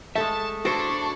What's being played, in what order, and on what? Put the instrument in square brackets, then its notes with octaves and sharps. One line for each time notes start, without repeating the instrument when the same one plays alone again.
[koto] G#3 A3 [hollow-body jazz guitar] A4 E5 [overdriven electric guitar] A5
[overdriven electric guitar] D4 [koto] E4 A4 [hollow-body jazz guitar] F#4 C5 [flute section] A5 C#6